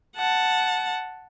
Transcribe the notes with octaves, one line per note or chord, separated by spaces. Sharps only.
F#5 A5